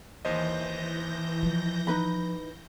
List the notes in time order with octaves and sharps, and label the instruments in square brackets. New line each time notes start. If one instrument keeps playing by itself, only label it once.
[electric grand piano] D#2 C5 D#5 [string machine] E3 G6 A#6
[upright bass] F3
[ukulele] D#4 B4 B5